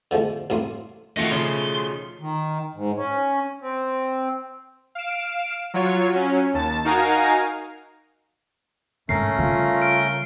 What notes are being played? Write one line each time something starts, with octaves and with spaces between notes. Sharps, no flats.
D3 F3 G#3 A3
C2 F#2 A3 A#3 C6 D#6
B2 D#3 A3 F4 D#5 F#5
C#3 F3 C#4 C6
D#3
G#2
C#4
C4
F5 D7 E7
F#3 F4 C#5
F#3 C#4
D#2 A5 A6
D#4 F#4 A#4 F5 G#5 A#5
G#2 A3 C#4 A#4 C7
C#3 G3 F4
F6 D7